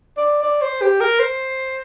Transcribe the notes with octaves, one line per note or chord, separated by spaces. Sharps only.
D5
D5
C5
G4
A#4
C5